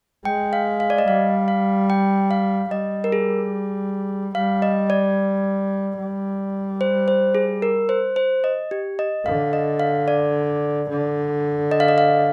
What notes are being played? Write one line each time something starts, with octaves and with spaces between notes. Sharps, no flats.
G#3 G5
F5
F5
D5
D#5
G3 F5
F5
G5
F5
G3 D#5
A#4
G#4
G3 F5
D#5
D5
G3
C5
C5
G#4
A#4
C5
C5
D#5
G4
D#5
D3 F5
D#5
F5
D5
D3
D#5
F5
D#5
F5